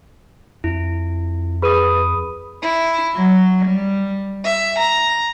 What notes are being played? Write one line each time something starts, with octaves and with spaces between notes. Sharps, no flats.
F2 E4
G#4 B4 B5 D#6 D#7
E4
F#3
G3
E5
A#5